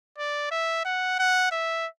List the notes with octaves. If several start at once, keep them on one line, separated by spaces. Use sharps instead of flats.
D5
E5
F#5
F#5
E5